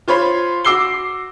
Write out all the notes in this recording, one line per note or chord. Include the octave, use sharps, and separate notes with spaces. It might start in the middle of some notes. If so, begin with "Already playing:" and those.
F4 C5 C#5 B5
F#4 D6 E6 C7 G7